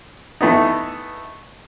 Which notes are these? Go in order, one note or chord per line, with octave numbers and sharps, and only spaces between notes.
E3 A3 B3 D#4